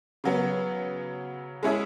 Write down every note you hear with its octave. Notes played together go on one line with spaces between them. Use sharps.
C#3 F#3 B3
G#3 C#4 E4 G#4